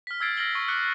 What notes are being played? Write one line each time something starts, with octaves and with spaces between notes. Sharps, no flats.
F6 B6
E6 F6 G#6 A6 C7 D7
F6 A#6 C7 D7 F#7 G7
C#6
D6 F#6 C#7 F#7 G7